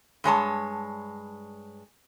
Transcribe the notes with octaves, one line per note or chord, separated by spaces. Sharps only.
G2 G#3 C#5 A5